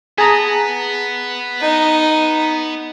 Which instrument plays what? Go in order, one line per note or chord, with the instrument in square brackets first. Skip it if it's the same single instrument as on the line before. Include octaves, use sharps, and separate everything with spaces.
[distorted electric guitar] B3 [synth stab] G#4 A5 A#5
[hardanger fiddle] D#4